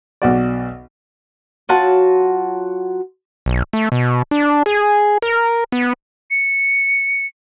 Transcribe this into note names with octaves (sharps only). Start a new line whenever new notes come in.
B1 F#4 D5
F#3 F4 F#4 A5
B1
A3
B2
D4
G#4
A#4
B3
C#7